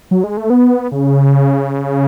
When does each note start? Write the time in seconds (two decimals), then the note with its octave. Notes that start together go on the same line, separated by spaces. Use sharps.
0.11 F#3
0.24 G#3
0.37 A3
0.50 B3
0.91 C#3